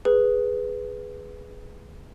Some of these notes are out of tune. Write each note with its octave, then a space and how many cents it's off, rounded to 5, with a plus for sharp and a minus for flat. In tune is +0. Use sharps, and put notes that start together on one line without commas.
G#4 +0 B4 +0